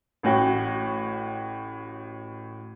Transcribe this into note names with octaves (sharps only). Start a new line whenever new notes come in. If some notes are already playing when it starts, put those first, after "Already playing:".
A1 A2 F#4 G5